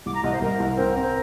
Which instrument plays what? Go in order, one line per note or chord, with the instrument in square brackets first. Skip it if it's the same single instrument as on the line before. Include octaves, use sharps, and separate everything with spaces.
[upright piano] C2 [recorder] D6
[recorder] A#5
[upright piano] C2 [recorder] D#5
[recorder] C5
[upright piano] C2 [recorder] A#4
[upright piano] C2
[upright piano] C4 [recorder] A#4
[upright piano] C4